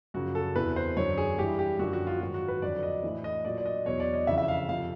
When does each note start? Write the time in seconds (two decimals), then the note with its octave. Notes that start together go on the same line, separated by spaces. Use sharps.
0.14 F#2 C#3 F3 F#4
0.35 A4
0.56 E2 C3 E3 B4
0.76 C5
0.97 F#2 D3 F#3 C#5
1.18 G#4
1.38 G2 E3 G4
1.59 G4
1.79 F#2 D3 F3 F#4
1.93 F#4
2.07 F4
2.20 G#2 D#3 F#3 F#4
2.34 F#4
2.48 B4
2.62 F2 D3 F#3 D5
2.83 D#5
3.04 A2 E3
3.24 D#5
3.45 A#2 F#3 D5
3.58 D5
3.66 D#5
3.86 E2 B2 F#3 C#5
4.00 D5
4.14 D#5
4.27 F2 C#3 E3 E5
4.38 E5
4.48 F5
4.69 F2 C3 F3 F5